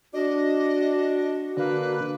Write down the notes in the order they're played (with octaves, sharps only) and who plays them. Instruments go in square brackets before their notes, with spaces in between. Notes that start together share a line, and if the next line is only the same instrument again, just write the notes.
[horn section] D4 [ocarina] F#4 [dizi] D#5
[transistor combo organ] D3 [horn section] A#3 [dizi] B4